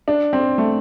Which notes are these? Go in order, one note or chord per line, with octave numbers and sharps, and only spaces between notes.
D4
C4
A3